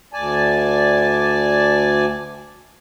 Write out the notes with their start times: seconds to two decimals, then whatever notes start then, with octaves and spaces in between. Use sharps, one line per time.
0.13 D2 D5 G#5 A5